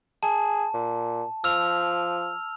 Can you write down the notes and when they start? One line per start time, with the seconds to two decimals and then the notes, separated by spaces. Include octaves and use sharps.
0.23 G#4 A5
0.74 A#2
1.44 F3 E6 F6 F7